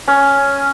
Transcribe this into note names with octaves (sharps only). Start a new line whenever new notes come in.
C#4